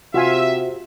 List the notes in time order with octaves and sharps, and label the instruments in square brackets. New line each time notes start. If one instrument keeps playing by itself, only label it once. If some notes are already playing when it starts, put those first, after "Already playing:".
[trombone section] C3 [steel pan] F4 F5 G#5 [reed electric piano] F#4 [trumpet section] E5